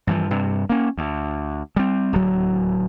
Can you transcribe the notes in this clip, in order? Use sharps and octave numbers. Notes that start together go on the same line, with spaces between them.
G2 E3 F3
G2 C3
A#3 C#4
D2
G3 C4
D1 D#2 F#3